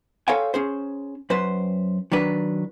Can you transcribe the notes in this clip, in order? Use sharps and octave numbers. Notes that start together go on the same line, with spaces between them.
A4 C5 C#5 F5 G5 G#5
C#4 G#4 C5
F#2 B4 C5
D#3 F#3 D4 B4